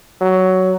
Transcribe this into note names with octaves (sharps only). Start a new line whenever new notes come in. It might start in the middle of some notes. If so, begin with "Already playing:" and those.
F#3